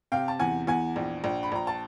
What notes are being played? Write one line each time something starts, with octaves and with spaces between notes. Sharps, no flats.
C3 F5 G5
A5
E2 F#5 G#5
E2 F#5 G#5
A#1
A#1
B5
A#1 A#5
A5